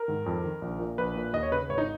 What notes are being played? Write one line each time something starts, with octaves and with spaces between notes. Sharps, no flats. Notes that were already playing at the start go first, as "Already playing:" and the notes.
Already playing: A#4
G#2 D#3
F2
D#3
A#1
A#2
A#1 B4
A#2
D#2 D#5
C#5
C#3 B4
G#1 C#5
D#4